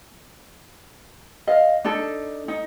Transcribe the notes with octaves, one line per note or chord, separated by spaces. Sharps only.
D#5 F5
D4 D#4 A4
D#4